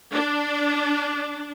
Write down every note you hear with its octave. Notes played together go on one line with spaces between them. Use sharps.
D4